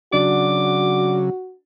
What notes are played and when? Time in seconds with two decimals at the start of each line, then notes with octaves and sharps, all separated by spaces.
0.13 C#3 F#3 D4 F#4 D6